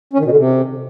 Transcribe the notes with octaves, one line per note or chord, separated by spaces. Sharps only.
C#4
D#3
B2
D3
C3